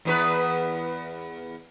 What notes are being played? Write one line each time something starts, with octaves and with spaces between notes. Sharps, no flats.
E2 B3 B4